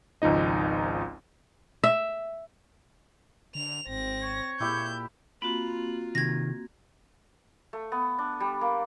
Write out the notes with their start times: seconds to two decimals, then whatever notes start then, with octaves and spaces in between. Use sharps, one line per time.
0.22 G#1 C#2 F3 D#4 D#5
1.84 E5
3.55 D3 F7
3.87 G#1 C4 A#6
4.22 C#5
4.60 A#2 E4 G4 E5 G6
5.42 A#3 C4 F4 F#4 B5
6.15 C3 D#3 G#6 A#6
7.73 A3
7.92 B3
8.19 D4
8.40 G3
8.61 A#3